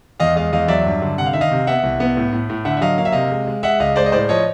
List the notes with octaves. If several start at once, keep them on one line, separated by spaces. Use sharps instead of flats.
E2 D#5 F5
G#3 D#5 F5
E2 D#5 F5
F#3 D5 E5
G2
D3
C3 F#5
F5
D#3 E5
D#5 F5
C3
B3 E5 F#5
C2
B3
A2
A2
A2
D3 E5 F#5
E5
F#3 D#5 F5
A#3 F5
E5
C3 D#5 F5
G#3
G#3
G#3 E5 F#5
C#2 D#5 F5
G#3 C5 D5
D#5
A2 C5 D5
F3 C#5 D#5